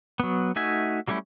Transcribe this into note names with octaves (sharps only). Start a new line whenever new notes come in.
F#3 B3
A3 D#4 F#4 E5 G#5
F#3 G3 A3 C#4 E4